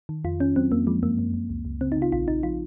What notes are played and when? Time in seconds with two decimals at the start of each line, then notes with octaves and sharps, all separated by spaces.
0.09 D#3
0.24 F2 F4
0.40 D#3 C#4
0.56 F#3 C4
0.72 F2 A#3
0.87 F3 G#3
1.03 F#2 A#3
1.19 F#2
1.34 F#2
1.50 C#2
1.65 C#2
1.81 C#3 C4
1.92 D#4
1.97 C#3
2.02 F4
2.12 A#1 F4
2.28 A#1 D#4
2.43 F3 F4